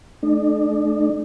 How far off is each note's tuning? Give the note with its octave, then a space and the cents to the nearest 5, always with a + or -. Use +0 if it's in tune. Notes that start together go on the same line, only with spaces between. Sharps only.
A3 -35 D4 +40